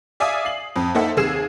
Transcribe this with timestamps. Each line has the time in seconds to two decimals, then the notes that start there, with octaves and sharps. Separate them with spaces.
0.20 D5 E5 F5 G#5 D6 D#6
0.45 C7 F#7
0.76 F2
0.95 A#3 D#4 A4 C5 E5 F#5
1.17 D#2 C3 G#4 E6 C7 E7